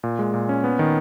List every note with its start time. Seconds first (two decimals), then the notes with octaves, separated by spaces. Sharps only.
0.03 A#2
0.19 G#3
0.34 A#2
0.49 C#4
0.64 B3
0.79 D#3